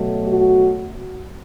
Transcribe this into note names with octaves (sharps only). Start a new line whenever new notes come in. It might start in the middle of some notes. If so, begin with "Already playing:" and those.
Already playing: B2 F#3 A3
F#4